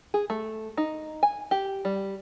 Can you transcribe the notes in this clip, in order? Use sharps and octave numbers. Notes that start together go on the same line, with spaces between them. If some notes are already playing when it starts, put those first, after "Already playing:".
G#4
A3
D#4
G#5
G4
G3